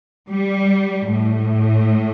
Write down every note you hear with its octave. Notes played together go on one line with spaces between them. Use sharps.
G3
A2